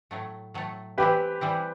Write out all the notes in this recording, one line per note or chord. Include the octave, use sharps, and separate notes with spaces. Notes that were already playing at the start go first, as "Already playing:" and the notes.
A2 F#3 A3
A2 F#3 A3
E3 G3 C4 E4 G4 B4
E3 G3 C4 E4